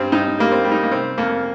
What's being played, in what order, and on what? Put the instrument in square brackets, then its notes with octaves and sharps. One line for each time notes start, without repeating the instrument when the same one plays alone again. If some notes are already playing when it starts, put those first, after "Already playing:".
Already playing: [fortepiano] G2 G3 C4
G2 D#4
G3 A#3
C4
G3
D#4
A#3
C3 C4
F2 A#3